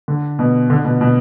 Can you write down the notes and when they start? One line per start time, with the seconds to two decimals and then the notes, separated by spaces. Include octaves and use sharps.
0.08 D3
0.39 B2
0.70 D3
0.84 B2
1.01 B2